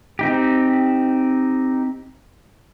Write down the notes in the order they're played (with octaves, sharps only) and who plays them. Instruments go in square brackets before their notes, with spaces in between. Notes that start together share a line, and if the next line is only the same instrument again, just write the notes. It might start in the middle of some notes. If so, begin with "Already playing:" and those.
[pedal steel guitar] C4 D#4 G4